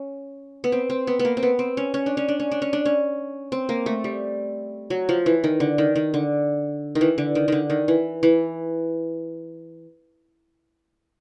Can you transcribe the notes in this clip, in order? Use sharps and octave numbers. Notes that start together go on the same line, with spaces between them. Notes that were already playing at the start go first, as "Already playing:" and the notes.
Already playing: C#4
B3
C4
C4
B3
B3
A#3
C4
B3
C4
C#4
C#4
D4
C#4
D4
C#4
D4
C#4
D4
C#4
C4
A#3
A3
G3
F#3
F3
E3
D#3
D3
D#3
D#3
D3
D#3
E3
D3
D#3
D3 D#3
D#3
E3
E3